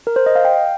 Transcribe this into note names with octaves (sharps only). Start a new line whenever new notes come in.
A#4
C5
D#5
F5
G5